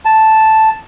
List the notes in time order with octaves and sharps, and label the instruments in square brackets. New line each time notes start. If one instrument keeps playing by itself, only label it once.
[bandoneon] A5